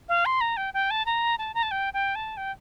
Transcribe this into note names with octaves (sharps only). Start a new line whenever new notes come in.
F5
C6
A#5
G5
G5
A5
A#5
A5
A#5
A5
G5
G5
A5
G5